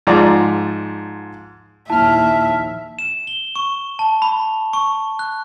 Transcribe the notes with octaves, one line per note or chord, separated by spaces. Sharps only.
G#2 F3 D5 A#5
A#1 D#2 E4 E5 A5 F6
E7
G7
C#6
A5
B5
C#6
F#6